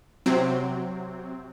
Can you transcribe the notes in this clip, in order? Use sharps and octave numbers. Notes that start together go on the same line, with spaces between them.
C3 F#3 C4